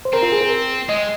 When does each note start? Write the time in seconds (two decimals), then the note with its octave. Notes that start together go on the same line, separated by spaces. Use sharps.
0.05 C5
0.13 C4 A#4
0.23 F4
0.32 G#4
0.41 A#4
0.89 G#3 D#5